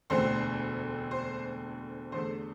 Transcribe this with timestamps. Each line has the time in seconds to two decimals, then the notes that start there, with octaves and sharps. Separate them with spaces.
0.10 E1 D2 D3 A3 C4 C5
1.11 C5
2.12 E2 D3 A3 C5